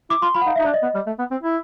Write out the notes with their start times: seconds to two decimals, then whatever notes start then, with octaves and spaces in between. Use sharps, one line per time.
0.10 E4 D6
0.22 F4 C6
0.34 F4 B5
0.41 F#5
0.46 D#4 F5
0.56 E5
0.59 D#4
0.65 D4 D5
0.74 D#5
0.82 B3
0.95 G3
1.07 A3
1.19 B3
1.31 C4
1.43 E4